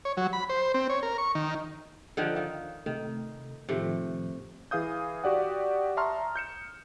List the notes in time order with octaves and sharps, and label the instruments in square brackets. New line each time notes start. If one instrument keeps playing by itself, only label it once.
[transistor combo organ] C#5
F#3
B5
C5
C4
C#5
A#4
C#6
D#3
[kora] D3 D#3 F3
[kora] D#3 [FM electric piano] F5
[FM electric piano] C3 A3 [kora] D#3
[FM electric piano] A2 D#3 F3 [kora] C3 A3
[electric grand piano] E3 G#4 F5 D#6 G6
F#4 G4 D5 F#5
E5 A5 A#5 C6 C#6 F6
G6 C#7 E7